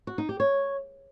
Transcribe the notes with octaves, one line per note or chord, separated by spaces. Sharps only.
F#4
D#4
G4
C#5